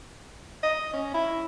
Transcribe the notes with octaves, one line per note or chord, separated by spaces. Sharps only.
D#5
C#4
E4